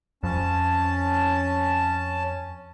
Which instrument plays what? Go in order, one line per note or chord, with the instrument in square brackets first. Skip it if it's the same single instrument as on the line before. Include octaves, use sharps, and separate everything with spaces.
[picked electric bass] F2 [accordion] C#4 A5